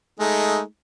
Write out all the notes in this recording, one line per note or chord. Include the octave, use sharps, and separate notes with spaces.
G#3 A3 D#4